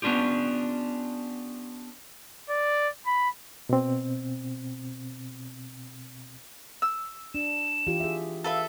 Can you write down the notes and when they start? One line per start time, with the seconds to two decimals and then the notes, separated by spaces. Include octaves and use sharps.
0.02 B3 C#4 D4 F4 G4
2.49 D5
3.07 B5
3.69 B2 C4
6.82 E6
7.35 D4 E7
7.87 E3 F4 G4
8.00 G#4 E5
8.44 A4 B4 E5 F5